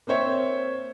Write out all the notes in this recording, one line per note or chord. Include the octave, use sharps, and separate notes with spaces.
A#3 C4 C5 C#5 E5